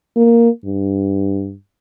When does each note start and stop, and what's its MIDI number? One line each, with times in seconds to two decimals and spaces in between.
0.16 0.49 58
0.65 1.54 43